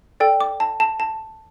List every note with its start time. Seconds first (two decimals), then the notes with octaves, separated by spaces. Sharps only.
0.20 A4 D5 G5
0.41 D6
0.60 A5
0.80 A5
1.00 A5